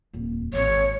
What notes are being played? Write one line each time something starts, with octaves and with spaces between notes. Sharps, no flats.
D#1 F2
G#1 C#5